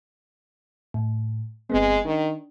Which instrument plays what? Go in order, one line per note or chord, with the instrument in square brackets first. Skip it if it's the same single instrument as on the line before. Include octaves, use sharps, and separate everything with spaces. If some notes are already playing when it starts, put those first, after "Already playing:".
[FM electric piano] A2
[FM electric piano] G1 B3 C4 [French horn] G#3
[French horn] D#3 [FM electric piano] D4